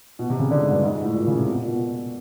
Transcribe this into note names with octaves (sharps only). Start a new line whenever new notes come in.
B2
C3
C#3
D3
G#2
G2
G#2
G#2
A2
A#2
C#3
C3
B2
A#2
B2